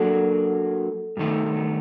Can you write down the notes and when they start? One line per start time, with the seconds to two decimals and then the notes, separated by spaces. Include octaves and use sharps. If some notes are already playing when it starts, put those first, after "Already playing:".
Already playing: F#3 A#3 D4 F#4 A4
1.17 G2 D#3 A3